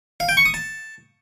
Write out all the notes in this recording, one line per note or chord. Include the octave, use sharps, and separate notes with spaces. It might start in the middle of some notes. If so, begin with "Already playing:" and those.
F5
G5
C#6
D#6
A5